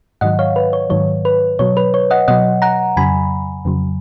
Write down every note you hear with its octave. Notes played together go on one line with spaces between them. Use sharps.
G#2 D#3 F#3 D#5 F#5
C#5 F5
B4
C#5
G#2 D#3 F#3 C#5
B4
B2 F#3 C#5
B4
C#5
D#5 F#5
B2 F#3 D#5 F#5
F#5 A#5
F2 C#3 F#3 G#5 B5
F2 C#3 F#3